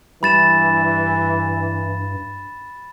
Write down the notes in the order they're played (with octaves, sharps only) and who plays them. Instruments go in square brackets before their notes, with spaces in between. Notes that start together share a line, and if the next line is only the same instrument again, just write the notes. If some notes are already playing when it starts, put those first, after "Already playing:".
[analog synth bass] G2 [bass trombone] E3 [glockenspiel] B5 A6 E7